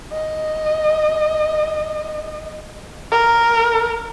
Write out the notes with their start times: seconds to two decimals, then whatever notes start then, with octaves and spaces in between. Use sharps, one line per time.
0.12 D#5
3.12 A#4